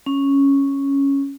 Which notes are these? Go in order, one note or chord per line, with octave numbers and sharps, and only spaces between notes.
C#4